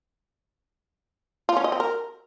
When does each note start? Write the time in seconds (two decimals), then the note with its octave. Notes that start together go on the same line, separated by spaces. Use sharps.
1.49 F4
1.57 C#4
1.64 D#5
1.72 C4
1.80 A#4